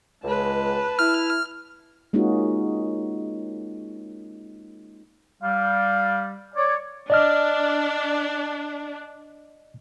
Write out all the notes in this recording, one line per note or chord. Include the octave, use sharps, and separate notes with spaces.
C#2 G#3 B4 A5
E4 F6
G#3 A#3 C#4 D#4 F4 F#4
G3 F5
C#5 D5
D4 D5 D#5 F6